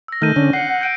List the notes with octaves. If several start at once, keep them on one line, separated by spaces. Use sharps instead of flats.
E6 A#6
D#3 A3 F6 G6 D#7
D3 C#4
F#5 C7 C#7
G6 D7 D#7